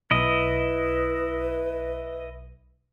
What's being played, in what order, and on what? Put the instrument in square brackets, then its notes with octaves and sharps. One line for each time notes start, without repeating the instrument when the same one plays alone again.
[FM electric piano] B1 [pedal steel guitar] E4 D#5 [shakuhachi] B4